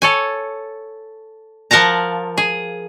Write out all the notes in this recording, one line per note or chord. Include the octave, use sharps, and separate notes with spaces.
A4 C#5 G#5
F3 A#4 F#5 A5 A#5
G#4